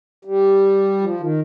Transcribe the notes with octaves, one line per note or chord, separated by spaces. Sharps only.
G3
F3
D#3